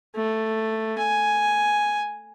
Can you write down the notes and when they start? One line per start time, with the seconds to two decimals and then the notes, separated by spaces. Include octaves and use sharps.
0.16 A3
0.98 G#5